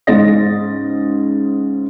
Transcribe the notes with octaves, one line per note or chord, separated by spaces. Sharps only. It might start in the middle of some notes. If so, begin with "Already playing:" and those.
G#2 C#3 C5 D#5 A6 A#6